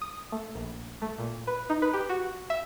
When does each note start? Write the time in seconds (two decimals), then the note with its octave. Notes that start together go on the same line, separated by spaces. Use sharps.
0.02 D#6
0.32 A3
0.55 A#1
1.02 A3
1.18 A#2
1.47 B4
1.70 D#4
1.82 B4
1.93 G4
2.09 F#4
2.50 E5